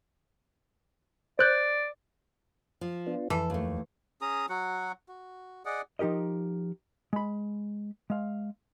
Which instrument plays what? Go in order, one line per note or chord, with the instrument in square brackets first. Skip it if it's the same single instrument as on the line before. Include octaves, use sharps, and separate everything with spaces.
[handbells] C5 F#6 G6 [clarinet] D5
[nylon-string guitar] F3
[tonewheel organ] B3 D4 F4
[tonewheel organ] F2 [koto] E3 [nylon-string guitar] A4
[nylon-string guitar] D#2 A3
[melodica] C#4 G#4 A#5 D#6
F#3 F#4 F#5
F#4
G#4 D5 D#5 F#5
[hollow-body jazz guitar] F3 D#4 G4 A#4 D#5
G#3 B5
G#3 F5